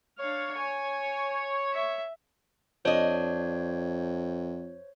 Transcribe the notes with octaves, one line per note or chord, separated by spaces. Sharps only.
D4 C#5 F5
G#5
E5
F2 D4 C5 C#5 D#5